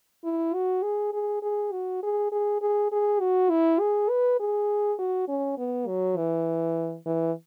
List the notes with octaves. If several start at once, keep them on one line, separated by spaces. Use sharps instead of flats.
E4
F#4
G#4
G#4
G#4
F#4
G#4
G#4
G#4
G#4
F#4
E4
G#4
B4
G#4
F#4
C#4
B3
F#3
E3
E3